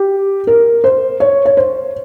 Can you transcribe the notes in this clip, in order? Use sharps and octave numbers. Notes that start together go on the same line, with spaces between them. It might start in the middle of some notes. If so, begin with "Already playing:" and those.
Already playing: G4
A#4
C5
C#5
C#5
C5